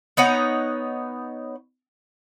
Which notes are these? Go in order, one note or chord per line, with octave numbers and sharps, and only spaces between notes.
B3 D#4 C#5 F#5